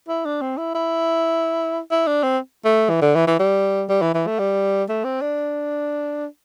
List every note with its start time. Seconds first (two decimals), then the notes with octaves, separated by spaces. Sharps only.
0.08 E4
0.25 D4
0.41 C4
0.58 E4
0.75 E4
1.91 E4
2.07 D4
2.23 C4
2.65 A3
2.90 E3
3.02 D3
3.15 E3
3.27 E3
3.39 G3
3.89 G3
4.02 E3
4.14 E3
4.27 A3
4.39 G3
4.89 A3
5.04 C4
5.21 D4